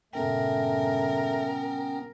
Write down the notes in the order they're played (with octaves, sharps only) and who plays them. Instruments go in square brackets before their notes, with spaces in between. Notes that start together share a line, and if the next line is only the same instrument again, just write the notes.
[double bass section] G2 A#2 C#3 [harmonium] A3 [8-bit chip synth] B3 C#4 G5 [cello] A#4